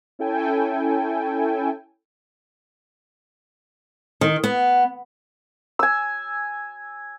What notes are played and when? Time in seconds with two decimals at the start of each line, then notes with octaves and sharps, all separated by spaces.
0.19 C#4 E4 A4 G5 G#5
4.21 D#3
4.44 B3
5.79 G#5 E6